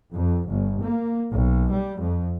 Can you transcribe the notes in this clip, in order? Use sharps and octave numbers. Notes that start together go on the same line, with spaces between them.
F2
G1
A#3
B1
G3
F2